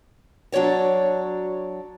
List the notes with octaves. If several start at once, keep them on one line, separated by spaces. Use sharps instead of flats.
F#3 D4 F#4 C#5 D5